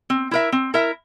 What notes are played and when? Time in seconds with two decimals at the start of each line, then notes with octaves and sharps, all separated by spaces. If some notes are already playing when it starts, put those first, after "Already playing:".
0.10 C4
0.31 E4 A#4 E5
0.52 C4
0.74 E4 A#4 E5